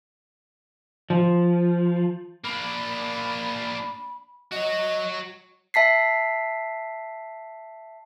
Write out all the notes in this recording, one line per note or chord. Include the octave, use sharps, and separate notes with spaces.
F3
A#3 D4 B5
F#4 C#5 D#5
E5 A5 B6 C7